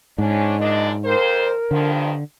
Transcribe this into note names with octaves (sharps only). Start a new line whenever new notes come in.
G#2 C#4 D4
F#2 A#2 D4 D#5
F2 A#4 C5
G2 D3 D#3 F3